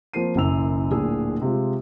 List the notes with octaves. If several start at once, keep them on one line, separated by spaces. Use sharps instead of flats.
F3 A#3 C4 C5 C7 D#7
F#1 B1 F#2 E4 E6 F7
D1 A#2 D4 G#4 E6
C3 G#3 F4